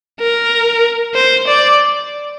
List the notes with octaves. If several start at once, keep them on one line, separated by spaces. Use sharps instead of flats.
A#4
C5
D5